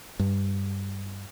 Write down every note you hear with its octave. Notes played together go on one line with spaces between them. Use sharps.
G2